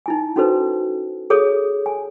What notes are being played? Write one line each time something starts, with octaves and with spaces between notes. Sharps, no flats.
D#4 E4 G#5
C#4 D#4 F#4 A4 B4 C5
G#4 A4 C#5 D#6
G#5